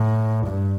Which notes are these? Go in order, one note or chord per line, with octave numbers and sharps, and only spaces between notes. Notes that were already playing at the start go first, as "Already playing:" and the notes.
Already playing: A2
G2